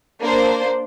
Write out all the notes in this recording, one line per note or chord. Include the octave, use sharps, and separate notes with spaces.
A#3 D4 C5